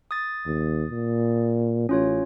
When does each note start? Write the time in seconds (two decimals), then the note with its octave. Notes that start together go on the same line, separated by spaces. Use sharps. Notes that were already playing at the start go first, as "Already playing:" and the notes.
0.11 D#6 A6
0.46 D#2
0.90 A#2
1.89 A1 C#4 F4 C#5